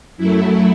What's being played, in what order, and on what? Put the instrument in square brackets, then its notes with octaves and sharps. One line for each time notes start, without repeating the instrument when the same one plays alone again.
[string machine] F#2 F#3 A3 E4